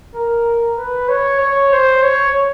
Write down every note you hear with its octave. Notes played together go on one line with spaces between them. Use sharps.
A#4
B4
C#5
C#5
C5
C#5